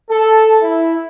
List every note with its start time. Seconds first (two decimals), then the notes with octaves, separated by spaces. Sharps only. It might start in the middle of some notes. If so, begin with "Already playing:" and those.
0.10 A4
0.62 E4